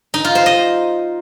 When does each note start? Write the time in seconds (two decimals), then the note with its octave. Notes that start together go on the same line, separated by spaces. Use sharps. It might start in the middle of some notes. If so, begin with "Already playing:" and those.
0.14 D#4
0.25 F4
0.35 C5
0.46 D#5